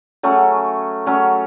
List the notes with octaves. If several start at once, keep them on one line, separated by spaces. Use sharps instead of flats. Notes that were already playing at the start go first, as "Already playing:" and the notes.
F#3 A3 C#4
F#3 A3 C#4